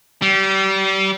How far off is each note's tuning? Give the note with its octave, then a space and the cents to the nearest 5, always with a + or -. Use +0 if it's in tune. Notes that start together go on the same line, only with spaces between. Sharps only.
G3 -30